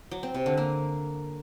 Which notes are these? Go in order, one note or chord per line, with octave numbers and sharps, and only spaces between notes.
F#3
C4
C3
D3
A#3